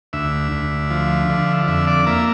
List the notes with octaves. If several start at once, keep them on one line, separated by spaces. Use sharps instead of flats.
D2 E5
D2
F3
D3
F2 E5
D5
A#3 E5